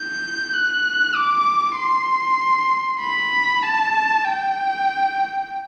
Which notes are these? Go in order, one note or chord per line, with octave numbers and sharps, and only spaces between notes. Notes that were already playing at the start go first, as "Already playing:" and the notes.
Already playing: G6
F#6
D6
C6
B5
A5
G5